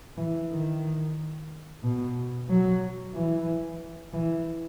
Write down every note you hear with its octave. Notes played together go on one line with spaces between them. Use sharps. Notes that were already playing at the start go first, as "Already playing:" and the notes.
E3
D#3
B2
F#3
E3
E3